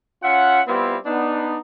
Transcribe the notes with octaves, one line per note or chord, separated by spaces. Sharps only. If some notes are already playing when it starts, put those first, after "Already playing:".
C#4 F4 E5 F#5
G3 B3 C4 E4 F4 G4
B3 D4 D#4